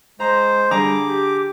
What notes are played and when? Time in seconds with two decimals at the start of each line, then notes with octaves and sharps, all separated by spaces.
0.20 G#3 C5 A#5
0.71 D3 G3 G#4 A#5 D6
1.07 G4